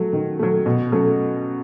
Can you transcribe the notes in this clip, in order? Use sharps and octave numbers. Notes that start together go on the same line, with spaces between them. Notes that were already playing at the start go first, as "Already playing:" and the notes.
Already playing: F#3 A3
D#3
F#3 A3
B2
F#3 A3 C#4